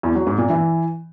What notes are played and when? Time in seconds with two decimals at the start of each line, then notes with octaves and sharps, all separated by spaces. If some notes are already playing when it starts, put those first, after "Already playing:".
0.03 E2
0.15 F#3
0.27 G#2
0.38 A#2
0.50 E3